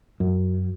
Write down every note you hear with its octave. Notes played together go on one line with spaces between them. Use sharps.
F#2